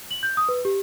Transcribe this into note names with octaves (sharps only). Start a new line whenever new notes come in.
F#7
G6
D#6
B4
G4